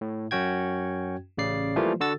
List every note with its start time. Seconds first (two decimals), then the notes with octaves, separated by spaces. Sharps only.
0.01 A2
0.31 F#2 C#4 F#4 G5 G#6
1.37 A1 C#3 D5 C7
1.76 E3 F3 G3 A3 A#3 F4
2.00 D3 F#4 A4 E6 A6